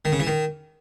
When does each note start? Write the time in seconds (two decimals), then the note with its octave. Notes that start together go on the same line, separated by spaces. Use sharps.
0.05 D#3
0.12 C#3
0.20 E3
0.27 D#3